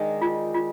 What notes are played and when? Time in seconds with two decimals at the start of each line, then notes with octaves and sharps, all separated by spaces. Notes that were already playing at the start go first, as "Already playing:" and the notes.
Already playing: D#3 G#3 D4
0.22 F4
0.54 F4